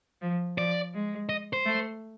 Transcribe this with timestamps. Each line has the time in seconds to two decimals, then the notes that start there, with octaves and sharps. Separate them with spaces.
0.21 F3
0.58 F3 D5
0.94 G#3
1.29 D#5
1.53 C5
1.65 A3